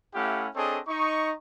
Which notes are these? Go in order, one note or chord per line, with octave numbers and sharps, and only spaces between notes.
A3 C#4 E4 G4 F5 F#5
C4 D4 G#4 A4 C#5 D#5
D#4 C#6